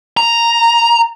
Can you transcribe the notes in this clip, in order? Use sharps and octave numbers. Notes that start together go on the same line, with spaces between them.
A#5